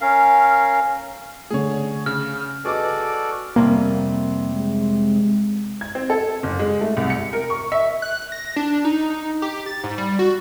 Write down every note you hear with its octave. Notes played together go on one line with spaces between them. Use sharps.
C#4 A#4 F5
D3 A3 G#4 C#5
C#3 F6
F#4 G#4 A4 B4 D5 D#5 D6
F2 C3 G3 A#3
G#3
G#6
C4
A4
F#1
G#3
A3
C2
C#7
A#4
C#6
E5
F#6
A#6
D4
D#4
G4
A6
G#2
G3
F#4